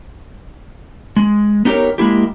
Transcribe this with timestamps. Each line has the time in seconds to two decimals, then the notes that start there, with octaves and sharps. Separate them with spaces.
1.16 G#3
1.65 B3 D#4 G4 A4 A#4 C#5
1.98 G#3 A#3 E4 G4